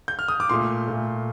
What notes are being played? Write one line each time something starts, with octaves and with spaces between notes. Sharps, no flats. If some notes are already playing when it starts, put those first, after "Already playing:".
G6
F6
D#6
D6
A#2 A3 C6
A#2 A3